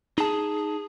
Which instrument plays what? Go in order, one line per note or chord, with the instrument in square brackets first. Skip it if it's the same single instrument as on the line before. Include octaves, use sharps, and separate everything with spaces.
[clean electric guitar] D#4 A5 [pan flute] G#4